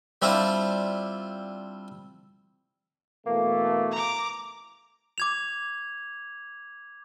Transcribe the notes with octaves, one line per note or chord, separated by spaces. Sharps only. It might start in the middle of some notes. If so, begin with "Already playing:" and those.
G3 C4 D4 E4 F4
B2 E3 A3 A#3
A#5 D6
D6 G#6 F7